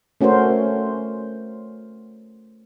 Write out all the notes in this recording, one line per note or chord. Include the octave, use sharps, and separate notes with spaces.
A3 C#4 F#4 A#4 C5